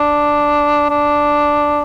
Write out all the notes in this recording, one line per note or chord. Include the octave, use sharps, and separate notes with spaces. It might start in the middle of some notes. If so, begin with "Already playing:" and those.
Already playing: D4
D4